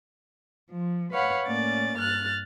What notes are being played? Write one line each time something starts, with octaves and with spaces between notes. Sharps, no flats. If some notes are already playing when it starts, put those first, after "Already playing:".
F3
B4 C#5 F5 F#5 B5
A2 A#3 C#4 D5 A6
G2 F6 F#6 A6